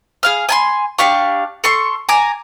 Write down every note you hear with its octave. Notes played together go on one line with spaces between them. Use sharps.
G#4 F5 F6
G#5 A5 C6
D4 G4 F5 C#6
A4 C6 C#6
G#5 A#5 D6